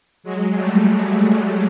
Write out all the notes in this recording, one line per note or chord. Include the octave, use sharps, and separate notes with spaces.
F#3 G#3
G3 A3